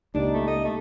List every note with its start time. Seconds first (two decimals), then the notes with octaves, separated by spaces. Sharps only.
0.15 C#2 A#3 D4 D#4 G4
0.34 A3
0.47 D#5
0.65 A3